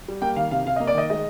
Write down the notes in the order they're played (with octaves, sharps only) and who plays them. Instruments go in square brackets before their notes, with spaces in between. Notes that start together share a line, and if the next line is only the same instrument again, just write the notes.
[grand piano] G3
A#3 G5
D#3 F5
C3 F5
C3 F5
A#3 D#5
D5
D#3 D#5
G#3 D#5